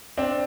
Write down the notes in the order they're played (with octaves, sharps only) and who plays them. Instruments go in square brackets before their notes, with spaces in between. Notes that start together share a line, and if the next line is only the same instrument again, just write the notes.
[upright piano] C4 D4